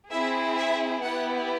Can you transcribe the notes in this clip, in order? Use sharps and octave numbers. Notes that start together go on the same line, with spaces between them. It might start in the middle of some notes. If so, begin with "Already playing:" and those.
C4 E4 G#4 E5
E5
B3 E4 G4 F#5